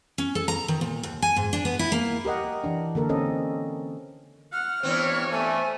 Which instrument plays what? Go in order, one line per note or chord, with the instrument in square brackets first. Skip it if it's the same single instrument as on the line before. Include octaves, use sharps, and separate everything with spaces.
[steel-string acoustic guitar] C#4
A4
A#5
D#3
A#2
D#2
G#5
G#2
D4
B3
E4
A#3
[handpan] G4 A#4 D#5 F#5
E3 D4
D3 A#3 A4 A#4
C4 C#4 A4 D#5
[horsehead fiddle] F#5 [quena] F6
[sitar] G2 E3 C4 [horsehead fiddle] B3 C#5
[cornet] A3 [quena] G#5